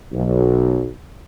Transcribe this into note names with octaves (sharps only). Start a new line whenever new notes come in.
B1